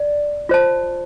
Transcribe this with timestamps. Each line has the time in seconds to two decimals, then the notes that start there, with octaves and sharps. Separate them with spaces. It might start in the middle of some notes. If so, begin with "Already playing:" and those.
Already playing: D5
0.49 F4 C5 A5